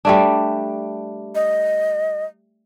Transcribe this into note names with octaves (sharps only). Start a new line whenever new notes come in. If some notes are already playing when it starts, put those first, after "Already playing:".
G3 A3 D4
D#5